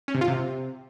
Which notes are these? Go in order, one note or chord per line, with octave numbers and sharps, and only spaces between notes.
C#4
C3
F4
C3